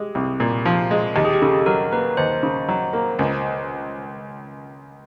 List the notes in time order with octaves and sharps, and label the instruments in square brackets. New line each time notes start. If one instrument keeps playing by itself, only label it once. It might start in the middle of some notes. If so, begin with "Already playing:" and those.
Already playing: [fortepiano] G#3 [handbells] G4
[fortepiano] C2
A#2
F3
G#3
[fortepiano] D#2 [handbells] G4
[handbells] G#4
G4
[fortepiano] C#3 [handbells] A4
[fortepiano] F#3 [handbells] A#4
[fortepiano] A#3 [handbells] B4
[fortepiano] D#2 [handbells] C5
[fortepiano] C#3
F#3
A#3
C#2